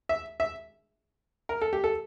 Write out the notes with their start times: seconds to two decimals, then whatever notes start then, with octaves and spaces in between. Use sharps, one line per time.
0.09 E5
0.40 E5
1.49 A#4
1.62 A4
1.73 G4
1.84 A4